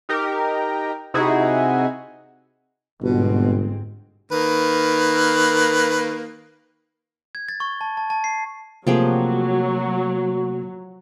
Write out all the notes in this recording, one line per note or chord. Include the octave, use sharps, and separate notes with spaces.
D#4 G4 A#4
C3 D#4 E4 F#4 G#4
G1 G#2 B2 G#3 C4
D#3 A#3 B4
G#6
A6
C#6
A5
A5
A5
C7
C3 F3 F#3 A3 A#3 G4 G#4